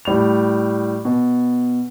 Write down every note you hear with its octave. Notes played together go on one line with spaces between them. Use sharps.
A2 G3 F7
B2